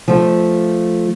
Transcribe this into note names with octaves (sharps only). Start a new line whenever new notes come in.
F3 A3